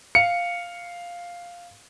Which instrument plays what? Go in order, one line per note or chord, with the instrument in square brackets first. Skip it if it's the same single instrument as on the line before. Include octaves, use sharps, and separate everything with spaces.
[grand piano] F5 [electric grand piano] C#7